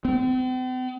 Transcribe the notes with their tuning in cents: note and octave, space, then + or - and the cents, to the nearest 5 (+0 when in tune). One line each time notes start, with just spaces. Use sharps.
C4 -45